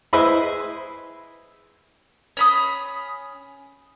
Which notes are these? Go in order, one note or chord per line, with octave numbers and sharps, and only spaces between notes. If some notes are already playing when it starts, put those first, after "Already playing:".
E4 G#4 B4 C5 D#5 E5
C#4 B5 D#6